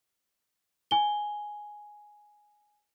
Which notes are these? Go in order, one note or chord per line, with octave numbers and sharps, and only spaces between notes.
G#5 G7